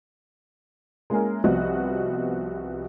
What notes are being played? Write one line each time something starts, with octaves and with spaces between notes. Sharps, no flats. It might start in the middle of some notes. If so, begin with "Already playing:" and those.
G#3 A#3 C#4 E4 G#4 A#4
C2 F3 B3 F#4 D#5